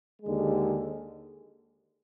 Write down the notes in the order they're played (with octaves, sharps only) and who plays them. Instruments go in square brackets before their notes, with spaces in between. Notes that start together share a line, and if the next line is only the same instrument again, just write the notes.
[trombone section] D#2 D3 G#3